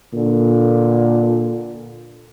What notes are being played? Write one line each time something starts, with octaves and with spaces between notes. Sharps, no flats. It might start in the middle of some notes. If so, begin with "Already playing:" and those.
A#2 D3